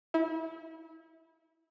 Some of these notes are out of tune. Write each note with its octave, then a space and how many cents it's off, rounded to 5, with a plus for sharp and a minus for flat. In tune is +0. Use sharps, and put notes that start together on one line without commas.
E4 -30